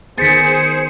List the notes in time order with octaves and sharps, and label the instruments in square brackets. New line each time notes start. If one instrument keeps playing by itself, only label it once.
[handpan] D#3 B3 [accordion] G#4 C5 G#5 [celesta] A6 B6 [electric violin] C#7